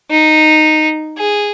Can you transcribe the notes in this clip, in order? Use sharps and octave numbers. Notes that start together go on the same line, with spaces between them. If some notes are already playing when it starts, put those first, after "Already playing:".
D#4
G#4